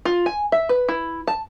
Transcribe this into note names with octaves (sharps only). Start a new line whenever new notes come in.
F4
G#5
E5
B4
E4
A5